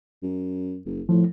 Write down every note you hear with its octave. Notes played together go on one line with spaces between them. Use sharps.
F#2
F#1
A2 F3